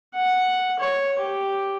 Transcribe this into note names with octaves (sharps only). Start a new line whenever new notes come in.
F#5
C#5
G4